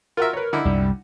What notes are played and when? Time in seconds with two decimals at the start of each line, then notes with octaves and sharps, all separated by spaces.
0.17 F4 F#4 A#4 E5
0.33 B4 C#5
0.53 D3 D#4 E4
0.65 C2 F#2 G3